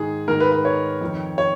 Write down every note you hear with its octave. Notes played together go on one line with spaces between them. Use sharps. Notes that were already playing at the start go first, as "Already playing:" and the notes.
Already playing: G#2 D#3 G#4
G#2 D#3 A#4
B4
B4
C#5
F2 D#3
C#5